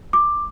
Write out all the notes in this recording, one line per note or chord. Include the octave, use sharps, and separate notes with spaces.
D6